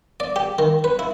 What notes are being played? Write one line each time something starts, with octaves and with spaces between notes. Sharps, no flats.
D5
G4
D#3
B4
E4